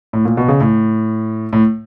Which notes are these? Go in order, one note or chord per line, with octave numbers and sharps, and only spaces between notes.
A2
A#2
B2
C#3
A2
A2